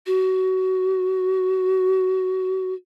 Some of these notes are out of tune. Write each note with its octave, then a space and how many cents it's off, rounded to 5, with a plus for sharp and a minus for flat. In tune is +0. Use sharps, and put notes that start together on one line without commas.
F#4 +20